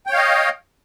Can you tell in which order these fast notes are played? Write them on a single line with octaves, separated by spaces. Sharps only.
G5 C#5 F5 D#5